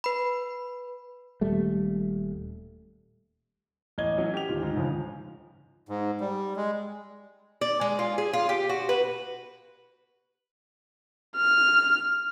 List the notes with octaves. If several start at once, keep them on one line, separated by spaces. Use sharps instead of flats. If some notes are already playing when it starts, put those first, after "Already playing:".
B4 B5
D#1 G3 A3
A1 D#5 G#6 G7
E3 F#3 C#4
G4 G5 F7
D1 D#3 F4
G#2
G1 C#2 C#3 F3
G#2
G3
G#3
D5
G#3
F4
G#4
F4
G4
F#4
B4
F6